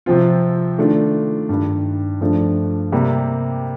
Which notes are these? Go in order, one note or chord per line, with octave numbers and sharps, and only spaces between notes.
C3 F3 C4 F4
D#3 A3 D4 F4
G2 D#3 G3
G2 F3 A3 D4
C3 G3 A#3